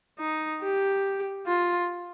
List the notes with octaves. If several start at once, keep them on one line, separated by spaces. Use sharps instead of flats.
D#4
G4
F4